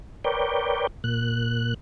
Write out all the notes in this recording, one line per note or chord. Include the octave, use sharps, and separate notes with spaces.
A#4 B4 C#5 D5 G5
A#2 F#6